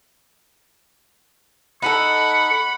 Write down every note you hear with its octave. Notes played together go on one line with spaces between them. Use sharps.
D#4 E4 A4 F#5 B5 C#6